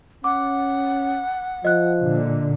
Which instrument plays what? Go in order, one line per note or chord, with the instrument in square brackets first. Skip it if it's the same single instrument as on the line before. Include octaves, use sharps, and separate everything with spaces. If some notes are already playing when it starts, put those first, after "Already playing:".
[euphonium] C#4 [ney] F#5 [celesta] D6
[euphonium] F3 [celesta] D#5 F#6
[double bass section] A#2 D3